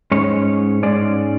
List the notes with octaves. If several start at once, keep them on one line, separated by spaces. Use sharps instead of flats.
G#2 G#3 C#4 C#5
G#2 G#3 C#4 D5